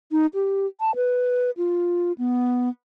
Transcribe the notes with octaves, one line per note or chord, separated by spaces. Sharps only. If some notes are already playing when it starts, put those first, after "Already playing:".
D#4
G4
A5
B4
F4
B3